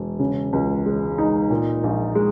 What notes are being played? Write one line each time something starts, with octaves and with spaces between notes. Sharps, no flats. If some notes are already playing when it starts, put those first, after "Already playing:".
Already playing: E1
C#3
C#2
G#3
D#4
A#2
A#1
G#3